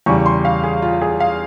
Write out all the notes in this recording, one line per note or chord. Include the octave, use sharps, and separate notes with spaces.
E2 C#3 G3 C#6
C6
F5
G#4
F4
G#4
F5